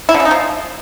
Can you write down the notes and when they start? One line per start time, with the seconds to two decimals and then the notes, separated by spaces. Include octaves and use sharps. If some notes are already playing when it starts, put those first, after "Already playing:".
0.09 E4
0.14 D3
0.20 C#3
0.25 D#4
0.31 F3